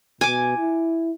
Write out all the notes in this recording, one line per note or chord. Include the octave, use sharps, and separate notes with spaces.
B2 G#5 D6
E4